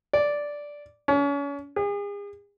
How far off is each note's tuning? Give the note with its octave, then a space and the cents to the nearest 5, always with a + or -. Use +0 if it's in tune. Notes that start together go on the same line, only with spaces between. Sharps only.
D5 -5
C#4 +35
G#4 -40